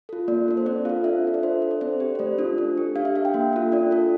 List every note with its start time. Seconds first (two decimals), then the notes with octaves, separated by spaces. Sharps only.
0.09 F4 A4
0.28 A#3 D5
0.48 D4 A4
0.57 C5
0.66 C4 D5
0.85 F4 F5
0.89 A4
1.04 D4 E5
1.25 F4 A4
1.34 D5
1.43 D4 C5
1.62 A4
1.71 D5
1.81 C4 C5
2.00 G4
2.15 C5
2.19 A3 D5
2.38 D4 F4 A4
2.58 D4
2.78 G4
2.96 D4 F5
3.05 E5
3.15 A4 F5
3.25 G5
3.34 A#3 E5
3.53 F4 A4
3.72 D4 D5
3.91 F4 A4